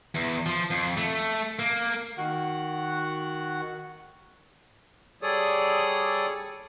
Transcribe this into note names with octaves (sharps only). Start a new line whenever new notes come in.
E2
F3
F2
A3
A#3
D#3 F#4 F#5
G3 G#4 A4 C#5 D5 D#6